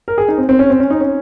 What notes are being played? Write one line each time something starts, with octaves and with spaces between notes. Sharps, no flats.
A#4
G#4
D#4
C4
C4
C#4
C4
C#4
D#4
C#4